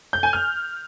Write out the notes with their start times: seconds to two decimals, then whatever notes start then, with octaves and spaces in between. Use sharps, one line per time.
0.13 G6
0.23 G#5
0.33 F6